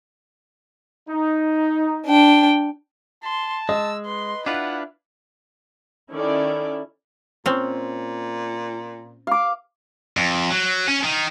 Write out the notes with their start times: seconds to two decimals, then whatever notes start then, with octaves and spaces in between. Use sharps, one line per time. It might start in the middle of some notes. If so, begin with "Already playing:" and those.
1.08 D#4
2.06 D4 G5
3.23 A5 C6
3.69 G#3 D#5 E6
4.05 B4 C6
4.46 D4 E4 F4 B4 F#5
6.12 D#3 C#4 E4 A4 D5
7.46 A#2 C4 C#4
9.27 F5 D6
10.17 F2
10.50 F#3
10.88 C#4
11.04 D#3